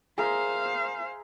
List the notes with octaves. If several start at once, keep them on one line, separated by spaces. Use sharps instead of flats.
G#4 A#4 C5 E5 F5